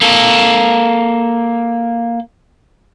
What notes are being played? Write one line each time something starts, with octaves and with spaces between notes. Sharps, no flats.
A#3 A4